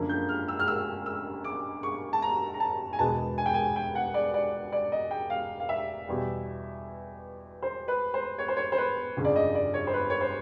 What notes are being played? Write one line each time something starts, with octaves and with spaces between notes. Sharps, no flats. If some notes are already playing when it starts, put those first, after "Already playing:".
Already playing: F#2 D3 F3 A#3
G6
F6
E6
F6
E6
E6
D6
C#6
A5
A#5
A#5
A5
G#5
E1 E2 B2 G#3 B3 A5
G#5
G5
G#5
G5
F#5
D5
D5
D5
D#5
G5
F5
F5
E5
E2 B2 G3
C5
B4
C5
C#5
C5
C#5
C5
B4
G1 F2 C#3 F3
D5
D#5
D5
C#5
C5
B4
C#5
C5